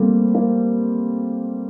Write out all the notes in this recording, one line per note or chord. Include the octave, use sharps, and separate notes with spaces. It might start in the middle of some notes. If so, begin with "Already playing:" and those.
Already playing: G3 A3 A#3 C4
A#3